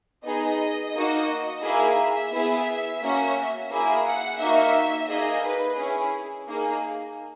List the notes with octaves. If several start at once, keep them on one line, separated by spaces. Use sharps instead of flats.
B3 D#4 G#4 D#5
A#3 D#4 F#4
A#3 E4 G#4 E5
B3 E4 G#4
A#3 C#4 F#4
A#3 E4 G#4 E5
F#5
A#3 D#4 F#4 E5
A#3 D#4 G#4 D#5
B4
C#4 E4 G#4
A#3 D#4 G#4